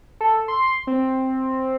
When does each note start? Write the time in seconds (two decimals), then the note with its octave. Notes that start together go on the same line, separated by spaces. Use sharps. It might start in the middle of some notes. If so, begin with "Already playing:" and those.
0.21 A4
0.48 C6
0.87 C4